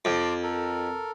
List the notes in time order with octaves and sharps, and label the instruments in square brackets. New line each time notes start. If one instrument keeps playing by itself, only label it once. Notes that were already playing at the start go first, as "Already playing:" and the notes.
[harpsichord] F2 [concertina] A5 C6 D6
[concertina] A4 A#4